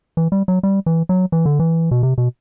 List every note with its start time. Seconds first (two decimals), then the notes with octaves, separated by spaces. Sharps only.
0.17 E3
0.32 G3
0.48 F#3
0.63 G3
0.86 E3
1.09 F#3
1.32 E3
1.46 D3
1.59 E3
1.91 B2
2.03 C3
2.18 B2